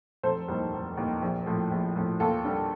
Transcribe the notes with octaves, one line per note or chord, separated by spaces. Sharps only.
F1 A4 C5
D#2 D#3 G3
F1
D#2 D#3 G3
A#1
A2 F3
A#1
A2 F3
D#2 F4 A4
D3 G3